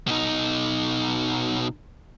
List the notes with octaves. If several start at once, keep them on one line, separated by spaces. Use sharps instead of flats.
B2 D#4